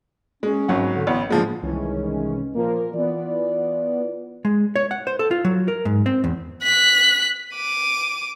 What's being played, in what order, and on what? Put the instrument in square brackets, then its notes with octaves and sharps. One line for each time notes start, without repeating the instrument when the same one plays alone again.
[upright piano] G#3 [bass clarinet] C#4
[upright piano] G#1 F#3 F#5
[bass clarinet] D3
[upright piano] A1 [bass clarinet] B3
[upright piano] D3 F3 G#3 [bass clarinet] A#3
[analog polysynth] C2 E3 C#4 [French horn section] D#3 G#3
[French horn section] A#2 A#4 [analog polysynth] F3 A#3
[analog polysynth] E3 B3 [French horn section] F4 D5
[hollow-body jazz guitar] G#3
C#5
F#5
C5
A4
F4
F#3
A#4
G#2
C4
E2
[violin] F#6 B6
D6 D#7